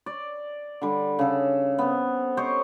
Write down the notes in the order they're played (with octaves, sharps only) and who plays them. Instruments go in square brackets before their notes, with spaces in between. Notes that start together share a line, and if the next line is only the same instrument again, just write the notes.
[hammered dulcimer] D5
D3 G3
C#3 A4
B3 C4
G4 C5 C#5 D#5